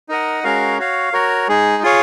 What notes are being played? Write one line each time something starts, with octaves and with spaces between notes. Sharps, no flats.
D#4 A#4 D#5 F#5
G#3 C#4 F#4 A#4 F5
F#4 C#5 F5
F#4 A#4 C#5
G#3 D#4 G#4
F4 G#4 C#5 F5